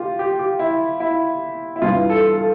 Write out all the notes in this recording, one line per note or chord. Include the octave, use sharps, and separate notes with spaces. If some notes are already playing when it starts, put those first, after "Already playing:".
Already playing: F4 G4
G4
G4
E4
E4
E4
G2 E3 F4
A4
A4